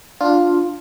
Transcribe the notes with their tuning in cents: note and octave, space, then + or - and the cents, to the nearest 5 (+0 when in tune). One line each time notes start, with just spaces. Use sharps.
D4 +0 F4 +5